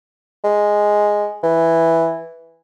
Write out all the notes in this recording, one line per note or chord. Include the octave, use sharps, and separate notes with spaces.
G#3
E3